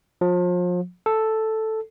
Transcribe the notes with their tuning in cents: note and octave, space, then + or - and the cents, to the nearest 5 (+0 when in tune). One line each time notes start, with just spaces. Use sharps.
F3 +35
A4 +0